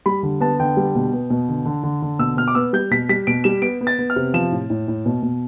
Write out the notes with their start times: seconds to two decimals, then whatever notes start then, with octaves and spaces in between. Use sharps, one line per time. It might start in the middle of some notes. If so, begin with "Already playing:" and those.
0.06 G3 B5
0.23 D3
0.41 B3 A5
0.60 D3 G5
0.77 G3
0.95 B2
1.13 B3
1.30 B2
1.49 D3
1.66 D3
1.83 D3
2.02 D3
2.19 B2 E6
2.37 B2 F6
2.48 D6
2.55 B3 E6
2.73 G3 G6
2.91 B2 B6
3.09 G3 B6
3.27 B2 D7
3.44 G3 E7
3.62 B3 D7
3.81 B3
3.87 A6
3.99 B3
4.10 F6
4.16 C3
4.34 F3 E7
4.52 A2
4.70 A2
4.88 A2
5.06 B2
5.23 B2